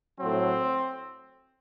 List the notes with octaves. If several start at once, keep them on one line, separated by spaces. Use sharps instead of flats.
A2 F#3 C4